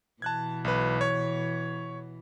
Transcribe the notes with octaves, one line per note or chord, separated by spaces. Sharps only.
B2 E3 A5 F#6 G#6
B1 B4
C#5